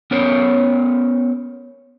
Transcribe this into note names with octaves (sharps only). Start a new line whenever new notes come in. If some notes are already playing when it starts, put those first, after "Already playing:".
B3 C#4 A#4 C5 C#5